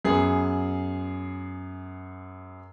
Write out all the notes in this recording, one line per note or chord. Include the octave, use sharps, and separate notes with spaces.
F#2 B3 G#4